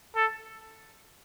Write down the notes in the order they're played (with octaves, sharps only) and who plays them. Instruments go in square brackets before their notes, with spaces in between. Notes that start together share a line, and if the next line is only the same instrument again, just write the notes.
[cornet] A4